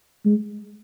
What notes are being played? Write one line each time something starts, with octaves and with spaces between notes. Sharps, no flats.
G#3